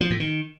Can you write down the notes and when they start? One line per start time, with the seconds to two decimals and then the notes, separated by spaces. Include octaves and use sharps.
0.01 F3
0.10 A2
0.20 D#3